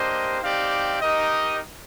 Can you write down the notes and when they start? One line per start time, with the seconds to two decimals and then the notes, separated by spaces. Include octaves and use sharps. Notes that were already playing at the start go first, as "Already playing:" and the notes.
Already playing: A#3 D4 G4 C5 D#5
0.41 C4 D#4 G4 D5 F5
1.01 D#4 G4 A#4 D#5